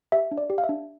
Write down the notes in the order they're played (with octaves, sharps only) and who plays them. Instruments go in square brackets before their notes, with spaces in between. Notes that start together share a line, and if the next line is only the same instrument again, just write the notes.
[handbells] G4 E5
D4
D5
G4
F5
E5
D4